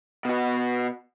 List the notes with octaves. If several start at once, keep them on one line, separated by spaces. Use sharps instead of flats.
B2 F#4